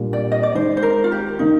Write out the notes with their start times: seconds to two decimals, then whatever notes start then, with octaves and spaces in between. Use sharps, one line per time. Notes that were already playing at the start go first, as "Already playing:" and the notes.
Already playing: A#2 G3 D4
0.13 D5
0.32 D#5
0.43 D5
0.55 D#3 G#3 D#4 C5
0.77 C5
0.82 A#4
1.04 F4
1.12 G4
1.39 D#3 A#3 D#4